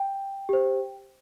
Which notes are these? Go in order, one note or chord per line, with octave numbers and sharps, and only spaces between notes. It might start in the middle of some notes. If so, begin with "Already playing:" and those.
Already playing: G5
G4 C5